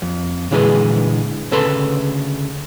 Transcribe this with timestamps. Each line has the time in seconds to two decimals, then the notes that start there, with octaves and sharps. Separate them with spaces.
0.02 F2
0.51 A#2 D3 E3 G#3 G#4 B4
1.51 D2 C#3 A4 B4 A5 C6